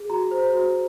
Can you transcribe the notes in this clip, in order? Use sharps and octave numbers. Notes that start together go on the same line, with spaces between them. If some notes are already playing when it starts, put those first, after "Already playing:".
Already playing: G#4
F#4 A#5
C5
F#4